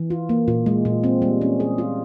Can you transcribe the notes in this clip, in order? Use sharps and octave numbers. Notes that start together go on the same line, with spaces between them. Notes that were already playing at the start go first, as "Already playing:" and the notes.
Already playing: E3
F4
A#3
A#2
G#3
A#2
C4
G3
C#4
G#4
F4